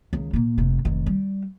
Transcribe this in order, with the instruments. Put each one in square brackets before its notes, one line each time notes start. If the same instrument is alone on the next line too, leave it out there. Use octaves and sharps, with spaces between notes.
[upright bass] C#2 D#3
A#2 A#3
F1 C3
F1 D#3
G3